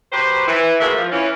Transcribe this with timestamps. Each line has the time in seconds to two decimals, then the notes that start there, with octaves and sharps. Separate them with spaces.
0.12 F#3 G4 B4 C5
0.48 E3
0.80 A2 G#3 A#3 F#4 B4 E5
0.96 F3
1.12 E3 C#4